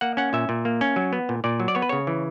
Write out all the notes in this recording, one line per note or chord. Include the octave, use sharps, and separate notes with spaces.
A#3 F#5
C#4 F#5
A#2 E5
A#2
A#3
C#4
F#3
B3
A#2
A#2 D5
F#3
D5
B3 C#5
B4
C#3 C#5
E3